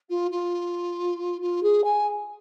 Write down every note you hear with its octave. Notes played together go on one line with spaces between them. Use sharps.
F4
F4
F4
G#4
G#5